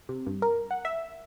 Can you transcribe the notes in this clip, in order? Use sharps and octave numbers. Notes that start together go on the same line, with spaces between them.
C3
G2
A#4
F#5
E5